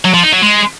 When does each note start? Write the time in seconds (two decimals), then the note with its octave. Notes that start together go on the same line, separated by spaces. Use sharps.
0.05 F#3
0.14 F3
0.23 D#4
0.33 F#3
0.42 G#3